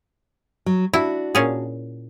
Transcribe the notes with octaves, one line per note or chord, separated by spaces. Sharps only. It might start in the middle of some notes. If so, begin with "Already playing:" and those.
F#3
D4 E4 F#4
A#2 C#4 G#4